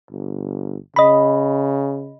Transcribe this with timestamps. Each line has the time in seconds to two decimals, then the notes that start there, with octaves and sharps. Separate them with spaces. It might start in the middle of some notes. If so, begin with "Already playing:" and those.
0.11 G1
0.96 C#3 D#5 B5